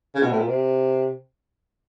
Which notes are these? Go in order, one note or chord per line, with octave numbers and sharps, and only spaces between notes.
C#3
B2
A2
A#2
C3